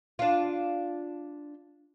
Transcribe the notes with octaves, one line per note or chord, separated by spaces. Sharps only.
D4 F4